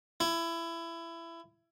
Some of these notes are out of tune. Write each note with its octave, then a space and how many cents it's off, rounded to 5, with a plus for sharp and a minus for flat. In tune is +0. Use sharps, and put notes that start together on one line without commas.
E4 +20